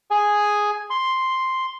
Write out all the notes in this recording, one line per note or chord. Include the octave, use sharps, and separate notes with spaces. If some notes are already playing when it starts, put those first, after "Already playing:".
G#4 G#5
C6